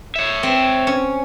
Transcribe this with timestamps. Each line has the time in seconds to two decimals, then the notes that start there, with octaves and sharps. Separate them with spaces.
0.16 C#5 E5
0.43 C4
0.87 C#4